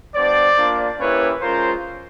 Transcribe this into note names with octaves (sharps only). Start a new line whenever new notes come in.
G3 B3 D4 C5 D5
A#3 D4 F4
A#3 C#4 E4 G4 B4 C#5
G#3 C#4 F4 A#4 C5